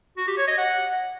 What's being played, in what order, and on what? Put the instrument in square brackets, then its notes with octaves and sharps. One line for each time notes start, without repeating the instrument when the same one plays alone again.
[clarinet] F#4
G4
C#5
D#5
F#5